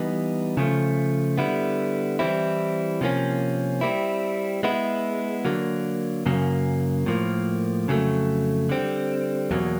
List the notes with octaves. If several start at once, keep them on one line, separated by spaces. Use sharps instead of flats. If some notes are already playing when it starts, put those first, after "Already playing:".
Already playing: E3 G3 B3 D#4
C#3 F3 A3
D3 G3 B3 E4
E3 G3 C4 E4
C3 F3 A#3 C#4
G3 C4 E4
G#3 B3 E4
D3 F#3 A#3
F#2 C#3 F#3 A#3
A2 F3 A#3
F2 C#3 F#3 A3
D3 G3 C4
E2 B2 F#3 A#3